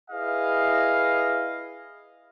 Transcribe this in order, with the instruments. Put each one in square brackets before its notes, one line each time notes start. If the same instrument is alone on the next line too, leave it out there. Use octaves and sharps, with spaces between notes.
[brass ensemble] E4 G#4 B4 D#5 F5